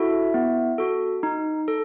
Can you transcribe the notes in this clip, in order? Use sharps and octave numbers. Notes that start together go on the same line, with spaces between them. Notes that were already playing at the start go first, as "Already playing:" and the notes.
Already playing: E4 F#4 A4 E5
B3
F#4 A4
D#4
A4